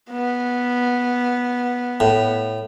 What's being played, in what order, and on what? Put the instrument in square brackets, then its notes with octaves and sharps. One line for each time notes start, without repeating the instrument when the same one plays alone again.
[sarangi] B3
[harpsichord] A2